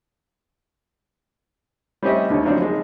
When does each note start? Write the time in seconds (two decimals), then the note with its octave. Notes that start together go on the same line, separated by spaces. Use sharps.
2.02 G3 C4 C#4 G4 D#5 E5
2.30 D#2 D3 D#4 C#5
2.45 F3 F#3 C4 D4 D#4 C#5
2.62 G#3